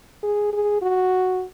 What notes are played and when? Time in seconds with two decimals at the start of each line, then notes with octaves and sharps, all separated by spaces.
0.23 G#4
0.53 G#4
0.82 F#4